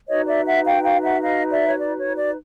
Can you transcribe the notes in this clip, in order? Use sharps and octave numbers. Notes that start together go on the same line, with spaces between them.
D#4 F#4 B4 C#5 D#5
D5 E5
E5 F#5
F5 G5
F5 G5
E5 F#5
D#5 F5
D5 E5
C#5
D5
C#5
D5